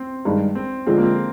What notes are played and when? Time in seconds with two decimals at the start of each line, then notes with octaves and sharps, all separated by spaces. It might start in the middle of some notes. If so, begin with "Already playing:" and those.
Already playing: C4
0.25 G2 D#3 G#3
0.55 C4
0.87 D3 F3 G#3 C4
0.98 A#3
1.03 C4